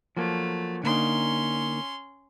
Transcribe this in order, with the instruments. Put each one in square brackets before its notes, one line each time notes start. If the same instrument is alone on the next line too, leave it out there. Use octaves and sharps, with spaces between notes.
[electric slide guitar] F3 F#3 A#3 [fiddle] A3
[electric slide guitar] D3 A#3 D#4 [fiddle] C#4 C6